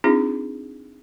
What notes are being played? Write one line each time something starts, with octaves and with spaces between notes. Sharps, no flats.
C4 D4 D#4 F4 G#4